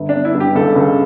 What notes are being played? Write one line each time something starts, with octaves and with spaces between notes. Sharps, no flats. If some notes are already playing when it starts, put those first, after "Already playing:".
Already playing: G1
B3 D4
E4
G2
G4
C#2 A4
C#2